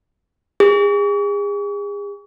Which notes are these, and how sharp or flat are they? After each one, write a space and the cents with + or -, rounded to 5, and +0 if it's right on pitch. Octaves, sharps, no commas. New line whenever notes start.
G#4 -35